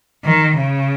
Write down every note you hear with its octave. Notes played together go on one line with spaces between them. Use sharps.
D#3
C#3